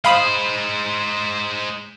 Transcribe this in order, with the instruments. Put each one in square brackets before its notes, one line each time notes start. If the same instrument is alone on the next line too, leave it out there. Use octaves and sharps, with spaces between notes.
[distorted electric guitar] G#3 C5 [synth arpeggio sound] F5 B5 D#6